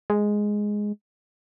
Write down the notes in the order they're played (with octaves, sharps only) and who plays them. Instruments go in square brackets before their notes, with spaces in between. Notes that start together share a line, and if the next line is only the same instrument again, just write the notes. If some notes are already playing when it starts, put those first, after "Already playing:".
[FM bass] G#3